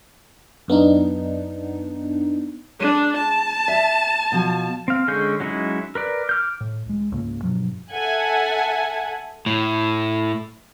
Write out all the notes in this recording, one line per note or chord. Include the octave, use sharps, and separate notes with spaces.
F#2 B3 D4 D#4
G#3 D4
A5
E5
B2 F3
C4 F5
D3 G#3 C#4 G#4 G6
F#3 G#3 C#4 D#4 E4
A#4 B4 D5
D6 F6 G6
A2
C#2 G#3
C#2 G#2 C#3 A#3
G2 B2 F3 F#3
A4 E5 F#5 G#5
A2